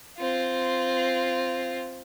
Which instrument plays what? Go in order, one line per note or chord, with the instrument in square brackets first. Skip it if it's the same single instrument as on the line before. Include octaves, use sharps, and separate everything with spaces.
[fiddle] C4 F4